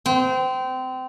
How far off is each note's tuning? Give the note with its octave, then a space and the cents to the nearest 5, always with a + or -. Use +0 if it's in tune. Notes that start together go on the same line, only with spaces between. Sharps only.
C4 -25